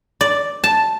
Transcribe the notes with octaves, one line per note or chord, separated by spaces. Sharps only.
D5
A5